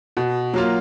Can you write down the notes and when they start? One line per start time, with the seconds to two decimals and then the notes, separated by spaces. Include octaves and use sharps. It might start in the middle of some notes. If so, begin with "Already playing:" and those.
0.17 B2
0.54 F#3 A#3 F4